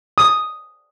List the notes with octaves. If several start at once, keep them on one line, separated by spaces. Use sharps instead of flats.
D#6